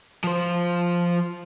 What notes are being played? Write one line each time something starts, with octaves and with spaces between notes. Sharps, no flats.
F3 C5